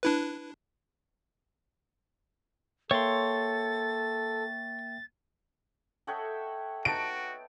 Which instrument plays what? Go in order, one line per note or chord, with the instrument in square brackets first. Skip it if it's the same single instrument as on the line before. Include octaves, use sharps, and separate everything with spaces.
[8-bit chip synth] D4 E4 B4
[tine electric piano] A#3 E5 G5 [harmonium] A4 [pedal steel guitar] C#5 C6 [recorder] A6
[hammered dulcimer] A4 C#5 E5 [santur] D#5 F#5 G5
[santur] B3 D#4 A5 [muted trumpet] F#4 [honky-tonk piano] D7